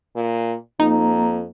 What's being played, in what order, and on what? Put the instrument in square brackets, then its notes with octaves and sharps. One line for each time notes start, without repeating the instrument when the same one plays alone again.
[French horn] A#2
[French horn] F2 [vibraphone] A#3 A#5 [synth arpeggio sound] D#4